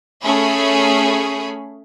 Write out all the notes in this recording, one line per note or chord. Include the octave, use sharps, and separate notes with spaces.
A3 C#4 G#4 B5